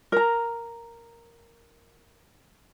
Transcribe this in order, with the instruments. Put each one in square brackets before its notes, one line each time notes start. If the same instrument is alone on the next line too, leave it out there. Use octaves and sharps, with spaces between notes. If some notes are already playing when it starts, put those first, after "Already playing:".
[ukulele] A#4 A#5